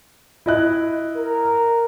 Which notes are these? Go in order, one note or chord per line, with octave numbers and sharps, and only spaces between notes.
E4 D#5 F#6
A#4